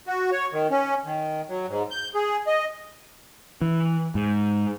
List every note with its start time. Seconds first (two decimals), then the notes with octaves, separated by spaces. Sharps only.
0.07 F#4
0.32 C#5
0.53 D#3
0.71 C#4
1.05 D#3
1.49 F#3
1.68 G#2
1.91 G6
2.15 G#4
2.47 D#5
3.62 E3
4.15 G#2